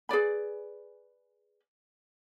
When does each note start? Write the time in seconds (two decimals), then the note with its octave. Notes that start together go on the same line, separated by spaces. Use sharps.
0.09 G#4 B4 D5 B5